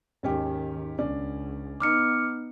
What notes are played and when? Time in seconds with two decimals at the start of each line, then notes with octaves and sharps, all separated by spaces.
0.23 D#2 G#2 D#3 C#4 G4
0.99 C#2 C#4 D4 D5
1.80 B3 D#4 D6 F6 C#7